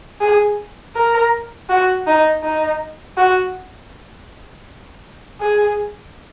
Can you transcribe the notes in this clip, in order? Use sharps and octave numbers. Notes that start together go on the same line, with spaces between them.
G#4
A#4
F#4
D#4
D#4
F#4
G#4